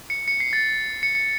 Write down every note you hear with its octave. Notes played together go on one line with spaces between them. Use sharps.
C#7
C#7
C7
A6
C#7
C#7